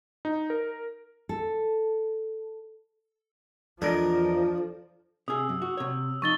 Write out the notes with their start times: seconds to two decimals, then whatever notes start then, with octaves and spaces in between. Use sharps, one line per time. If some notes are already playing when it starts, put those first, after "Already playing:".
0.25 D#4
0.50 A#4
1.29 A4
3.82 E2 F3 D4 A4 A#4 D#5
5.28 C3 G#4 D#6 E6
5.49 F#2
5.62 F#4
5.77 C3 C#5
6.22 F2 D#4 C#6 A6 G7